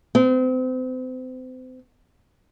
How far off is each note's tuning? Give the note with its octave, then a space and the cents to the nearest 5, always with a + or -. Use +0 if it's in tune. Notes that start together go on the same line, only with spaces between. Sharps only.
C4 -35